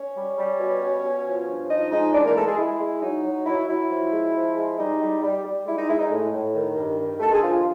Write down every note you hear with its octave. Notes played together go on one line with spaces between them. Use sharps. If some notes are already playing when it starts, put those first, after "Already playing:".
Already playing: C#4 C#5
G3
G3
B2
B2
B2
F3
G2
F3 D#4 D#5
G#3 D#4 D#5
E3 D4 D5
A#3 A#4
G#3 A3 A4
G#3 G#4
G#3 E4
G#3
F#3 D#4
F#3
F#3 E4
F#3 E4
F3
G#3
F3
G#3
G3 D#4
G3
G3
G3
G#3 E4
D#4
G#3 E4
D#4
A2
A2
D#3
G2
D#3
G2 A3 A4
G#3 G#4
D3 F3 F4